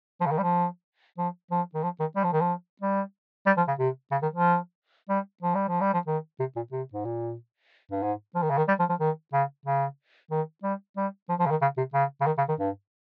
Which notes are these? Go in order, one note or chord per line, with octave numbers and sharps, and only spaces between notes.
F3
C#3
D#3
G3
F3
F3
F3
D#3
F3
D#3
G3
F3
D#3
F3
G3
G3
F3
C#3
C3
C#3
D#3
F3
G3
F3
G3
F3
G3
F3
D#3
C3
A#2
C3
G#2
A#2
G2
G#2
F3
D#3
C#3
D#3
G3
F3
F3
D#3
C#3
C#3
D#3
G3
G3
F3
F3
C#3
D#3
C#3
C3
C#3
C#3
D#3
C#3
D#3
G2